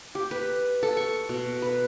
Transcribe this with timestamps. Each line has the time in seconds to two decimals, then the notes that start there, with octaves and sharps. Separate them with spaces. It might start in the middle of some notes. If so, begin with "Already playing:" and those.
0.15 G4
0.31 B4
0.83 A4
0.97 C#6
1.29 B2
1.62 B4